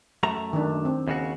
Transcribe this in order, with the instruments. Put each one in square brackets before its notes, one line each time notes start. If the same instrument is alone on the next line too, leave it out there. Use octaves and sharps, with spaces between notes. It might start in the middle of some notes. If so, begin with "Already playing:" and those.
[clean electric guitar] F#2 A3 A#5
[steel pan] D#3 D4
C4
[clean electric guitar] D#2 C#3 F#4